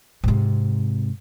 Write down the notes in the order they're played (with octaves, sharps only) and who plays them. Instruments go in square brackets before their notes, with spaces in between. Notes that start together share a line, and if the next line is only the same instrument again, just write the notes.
[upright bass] G#2 C3